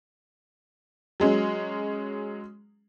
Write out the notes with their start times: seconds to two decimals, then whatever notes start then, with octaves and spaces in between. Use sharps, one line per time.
1.20 F#3 G#3 C#4